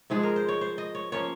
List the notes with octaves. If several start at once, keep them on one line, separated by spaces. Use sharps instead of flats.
G#2 F3 G#3 G#4
A#4
C5
C#5
C5
D#5
C#5
F3 A#3 C#4 C#5